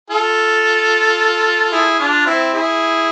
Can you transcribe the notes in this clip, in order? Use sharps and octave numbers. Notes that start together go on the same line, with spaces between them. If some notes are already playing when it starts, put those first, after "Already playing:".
F4 A4
E4 G#4
D4 F4
C4 E4
E4 G#4